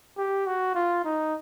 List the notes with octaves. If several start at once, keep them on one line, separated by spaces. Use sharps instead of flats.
G4
F#4
F4
D#4